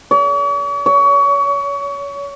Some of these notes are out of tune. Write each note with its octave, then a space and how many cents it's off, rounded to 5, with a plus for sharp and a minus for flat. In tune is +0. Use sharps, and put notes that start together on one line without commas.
C#5 +45
C#5 +30